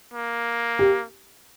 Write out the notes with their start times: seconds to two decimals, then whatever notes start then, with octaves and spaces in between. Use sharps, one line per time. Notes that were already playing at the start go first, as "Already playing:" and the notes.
0.14 A#3
0.79 G4